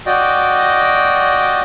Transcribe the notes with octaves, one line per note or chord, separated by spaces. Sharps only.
F#4 D5 D#5 G5